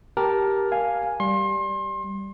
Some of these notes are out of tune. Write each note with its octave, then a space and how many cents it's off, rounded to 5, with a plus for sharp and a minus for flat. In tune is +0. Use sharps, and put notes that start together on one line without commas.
G4 +0 A#4 +10 A5 +0
F5 +0 G#5 +0
G3 +0 C6 +35